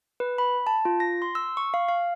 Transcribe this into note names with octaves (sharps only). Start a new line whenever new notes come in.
B4
B5
A5
F4
A#6
C6
E6
C#6
F5
F5